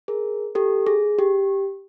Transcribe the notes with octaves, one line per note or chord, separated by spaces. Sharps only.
G#4 A#4
G4 A4
G#4
G4